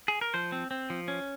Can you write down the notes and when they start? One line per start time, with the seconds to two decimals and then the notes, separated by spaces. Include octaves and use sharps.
0.08 G#4
0.21 A#4
0.34 F3 C5
0.52 C4
0.71 C4
0.90 F3
1.08 C#4